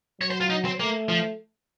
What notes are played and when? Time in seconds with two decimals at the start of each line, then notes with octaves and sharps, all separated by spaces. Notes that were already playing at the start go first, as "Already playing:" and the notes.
0.20 F#3 C#5
0.30 C5
0.41 F4
0.50 D#4
0.65 C4
0.79 A3 A#3
1.09 F3